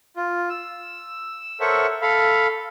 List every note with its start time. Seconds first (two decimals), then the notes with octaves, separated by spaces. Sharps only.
0.17 F4
0.50 E6
1.60 A4 A#4 C5 C#5 E5 F#5
2.02 A4 F5 B5